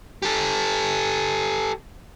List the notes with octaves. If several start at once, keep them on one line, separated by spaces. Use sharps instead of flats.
G4 A4